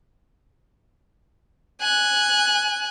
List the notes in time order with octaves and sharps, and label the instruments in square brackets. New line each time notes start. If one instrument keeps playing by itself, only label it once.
[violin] G#5 F#6